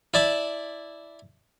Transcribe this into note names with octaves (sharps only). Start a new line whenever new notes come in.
E4 D5 A5 D6